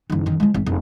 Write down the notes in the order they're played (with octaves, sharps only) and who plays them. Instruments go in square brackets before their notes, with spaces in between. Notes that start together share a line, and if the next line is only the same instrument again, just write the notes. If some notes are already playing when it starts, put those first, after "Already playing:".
[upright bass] F#1 D#3
F#2 D#3
F3 G#3
G#1
F1